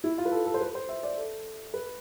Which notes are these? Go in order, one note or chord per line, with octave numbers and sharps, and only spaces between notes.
E4
F4
B4
A4
A4
C5
B4
C5
E5
D5
A4
B4